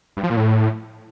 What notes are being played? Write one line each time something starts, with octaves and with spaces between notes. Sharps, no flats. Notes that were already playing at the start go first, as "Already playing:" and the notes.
G2
F3
A#2
A2